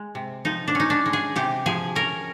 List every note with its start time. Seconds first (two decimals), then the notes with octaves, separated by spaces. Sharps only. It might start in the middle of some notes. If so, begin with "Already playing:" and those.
Already playing: G#3
0.15 C3
0.45 F3 D#4
0.68 D4
0.75 C#4 D#4
0.90 D4
1.06 G#3
1.13 G#4
1.36 C3 G4
1.66 F3 G#4
1.95 C#4 A#4